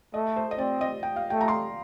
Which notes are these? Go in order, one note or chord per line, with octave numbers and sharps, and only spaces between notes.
A3 D#5
C5
D#5
C4 D5
D#5
G5
F5
A3 G5
A#5
C6